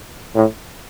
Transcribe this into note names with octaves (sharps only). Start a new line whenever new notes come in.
A2